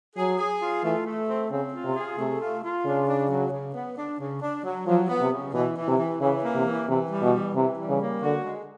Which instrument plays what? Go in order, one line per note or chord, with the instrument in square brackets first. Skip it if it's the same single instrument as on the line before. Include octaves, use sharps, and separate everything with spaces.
[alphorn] F#3 [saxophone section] G#4
[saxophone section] G#4
F4
[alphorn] E3 [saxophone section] A3
[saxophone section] A3
C4
[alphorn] C#3 [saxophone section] C4
[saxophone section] F4
[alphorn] C3
[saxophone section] G#4
[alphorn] C3 [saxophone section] A3
[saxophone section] F4
F4
[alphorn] C#3 [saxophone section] D4
[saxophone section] D4
F#3
C#3
B3
D4
C#3
D4
F#3
[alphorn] F3 [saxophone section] F#3
[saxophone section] B3
[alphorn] C3
[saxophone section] C#3
[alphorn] B2 [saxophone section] E3
[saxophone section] E3
[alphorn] C3
[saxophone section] E3
[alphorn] C#3 [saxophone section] E3
[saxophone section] A#3
[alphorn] C3
[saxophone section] E3
[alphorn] C3 [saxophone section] E3
[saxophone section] G3
[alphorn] B2
[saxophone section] E3
[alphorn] C3 [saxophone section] E3
[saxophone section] G3
[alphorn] C#3
[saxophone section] A#3
[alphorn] D3 [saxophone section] F#4
[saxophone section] G#3